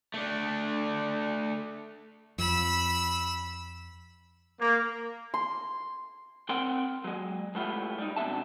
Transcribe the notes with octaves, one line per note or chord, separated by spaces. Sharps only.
A3 D4
F2 B5 E6
A#3
C6
C4 A#4 F#5 G5 C6
F#3 G#3
G#3 A3 B3 E4 F4 G4
G3 D#4
F2 B2 A3 D4 E5 A5